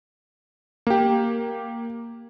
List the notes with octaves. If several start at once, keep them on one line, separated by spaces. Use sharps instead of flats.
A#3 G4